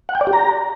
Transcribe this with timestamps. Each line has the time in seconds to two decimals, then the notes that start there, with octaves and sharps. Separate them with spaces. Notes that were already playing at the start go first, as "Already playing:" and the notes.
0.09 F#5
0.15 G5
0.21 D5
0.27 G4
0.33 A#5